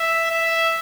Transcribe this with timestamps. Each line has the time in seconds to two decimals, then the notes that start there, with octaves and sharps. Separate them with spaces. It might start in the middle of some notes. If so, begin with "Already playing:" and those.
Already playing: E5
0.31 E5